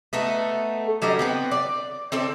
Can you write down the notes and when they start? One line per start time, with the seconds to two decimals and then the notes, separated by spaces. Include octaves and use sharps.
0.13 A3 B3 D#4 A4
1.02 F#3 G3 D4 D#5
1.19 B3 C4 B4
1.51 D5
2.12 C4 D4 A4 D5